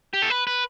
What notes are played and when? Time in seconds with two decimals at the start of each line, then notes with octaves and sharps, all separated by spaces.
0.14 G4
0.22 A4
0.30 B4
0.47 B4